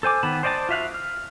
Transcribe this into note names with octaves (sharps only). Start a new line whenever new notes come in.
A4 C5 G#5 D6
D#3 B3 A5 B5
C5 D5 D#5 F#5 A5
F4 F#4 E5 F5 F#6
F6